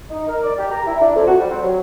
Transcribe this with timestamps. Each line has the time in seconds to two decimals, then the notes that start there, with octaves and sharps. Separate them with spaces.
0.10 D#4
0.28 A#4
0.43 D5
0.59 G4
0.71 A#5
0.86 E4
1.01 D4
1.15 F2
1.27 F#4
1.39 G3
1.50 C4
1.62 F#3